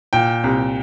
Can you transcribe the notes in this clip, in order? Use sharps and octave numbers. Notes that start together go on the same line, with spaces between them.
A#2 G5
C2